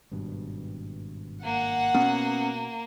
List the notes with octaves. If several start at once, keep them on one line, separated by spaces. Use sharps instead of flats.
G#1 G2 B2
A#3 F#5
B2 B3 C#4